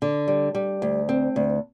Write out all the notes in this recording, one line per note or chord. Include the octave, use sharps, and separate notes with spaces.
D3
G3
G3
D2
C4
D2